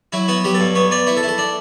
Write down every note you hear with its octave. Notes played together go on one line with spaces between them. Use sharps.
F#3 E4
B3 F#4
F#3 G4
A4
G2
B3 C#5
B3 D5
E4 C#5
A4
E4
A4
D4